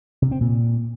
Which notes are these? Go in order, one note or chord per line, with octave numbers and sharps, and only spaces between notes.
C3
C4
A#2